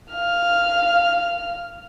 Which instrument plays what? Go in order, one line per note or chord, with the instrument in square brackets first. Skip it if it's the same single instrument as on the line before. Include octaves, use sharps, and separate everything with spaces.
[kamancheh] F5 F6